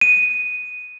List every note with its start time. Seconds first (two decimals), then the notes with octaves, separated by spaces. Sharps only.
0.01 D#7